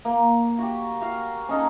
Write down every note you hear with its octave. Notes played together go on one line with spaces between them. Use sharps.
A#3
F#4 G4
F#4 F5
C#4 D#4 A4